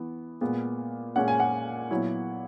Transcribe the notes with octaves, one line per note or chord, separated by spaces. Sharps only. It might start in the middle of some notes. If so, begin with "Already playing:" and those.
Already playing: E3 B3 E4
A#2 G#3 B3
A#2 G#3 C#4 F#5
G#5
F#5
A#2 F#3 B3 E4